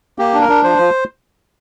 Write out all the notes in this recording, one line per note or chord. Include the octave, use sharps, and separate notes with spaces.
A#3 G4
D4
A#4
D4
F3 C5
F3